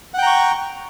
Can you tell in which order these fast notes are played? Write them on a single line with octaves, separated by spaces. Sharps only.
F#5 G5 A#5 C#6